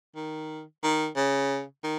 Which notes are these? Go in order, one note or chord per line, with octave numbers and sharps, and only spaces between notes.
D#3
D#3
C#3
D#3